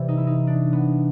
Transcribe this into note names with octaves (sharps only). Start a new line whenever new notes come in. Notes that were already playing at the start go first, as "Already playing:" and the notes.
Already playing: C3 E3 G3
D#4
E4
D#4
D4
B3